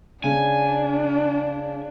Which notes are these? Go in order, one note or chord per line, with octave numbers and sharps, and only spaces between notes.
C#3 D4 G#5